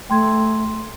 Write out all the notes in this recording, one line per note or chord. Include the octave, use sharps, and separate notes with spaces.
A3 G5 C6 G#6